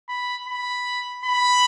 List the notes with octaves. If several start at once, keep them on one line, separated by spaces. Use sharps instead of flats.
B5
B5
B5